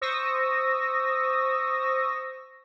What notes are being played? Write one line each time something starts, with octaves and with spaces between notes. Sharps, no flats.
C5 C#6 D#6 E6 A#6